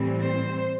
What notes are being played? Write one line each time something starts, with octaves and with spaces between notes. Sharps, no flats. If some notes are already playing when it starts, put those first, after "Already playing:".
Already playing: A2 E3 G3 C4
C5